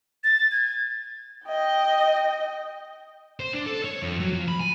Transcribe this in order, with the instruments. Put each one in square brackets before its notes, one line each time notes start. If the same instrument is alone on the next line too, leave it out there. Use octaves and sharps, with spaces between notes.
[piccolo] A6
G#6
[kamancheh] D#5 G5
[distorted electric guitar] C5
D4
A4
C#5
F2
F#3
F3
B5
G#5